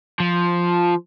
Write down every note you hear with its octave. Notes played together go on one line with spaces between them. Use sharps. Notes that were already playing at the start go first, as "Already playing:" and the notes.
F3